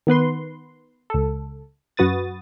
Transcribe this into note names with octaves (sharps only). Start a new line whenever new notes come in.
D#3 B3 B4 C6
C#2 A4
F#2 F#4 B4 D#6 A6